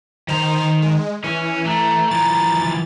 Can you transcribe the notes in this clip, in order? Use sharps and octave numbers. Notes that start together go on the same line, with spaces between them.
D#3 C5 A#5
G#3
E3 C#4
A3 A#5
E3 F3 A6